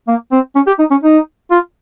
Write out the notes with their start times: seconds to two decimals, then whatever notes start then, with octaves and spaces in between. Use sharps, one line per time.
0.08 A#3
0.32 C4
0.56 C#4
0.67 G4
0.79 D#4
0.91 C#4
1.03 D#4
1.51 F4